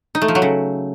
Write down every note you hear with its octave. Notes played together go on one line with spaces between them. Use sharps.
D#4
A3
F3
F#3
C#3